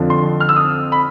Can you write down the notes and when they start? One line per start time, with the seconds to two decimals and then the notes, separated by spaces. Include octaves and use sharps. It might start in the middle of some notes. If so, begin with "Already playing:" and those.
Already playing: F2 D3 F3
0.10 C6
0.40 F6
0.49 E6
0.56 D#6
0.92 B5